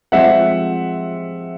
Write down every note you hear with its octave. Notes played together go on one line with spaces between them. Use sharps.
F3 G#3 C4 E5 F#5